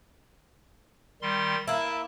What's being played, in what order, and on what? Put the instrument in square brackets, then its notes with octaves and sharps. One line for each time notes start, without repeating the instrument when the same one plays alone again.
[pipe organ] D#3 G3 C6
[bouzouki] A#3 E4 [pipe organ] A5